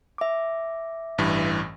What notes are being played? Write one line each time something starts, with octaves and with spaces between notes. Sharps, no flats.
E5 D6
A1 G2 E3